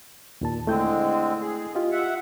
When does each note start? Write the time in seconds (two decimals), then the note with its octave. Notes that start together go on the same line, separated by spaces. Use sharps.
0.41 D#2 A#2 A5
0.67 D3 G#3 A3 C4 E4 G6
1.41 G#4
1.75 F4 G4 D#5
1.92 E5 F#5